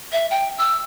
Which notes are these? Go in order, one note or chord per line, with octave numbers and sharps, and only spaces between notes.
E5
G5
E6